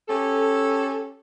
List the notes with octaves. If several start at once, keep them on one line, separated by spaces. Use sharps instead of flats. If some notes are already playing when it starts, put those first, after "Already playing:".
C#4 G4 A4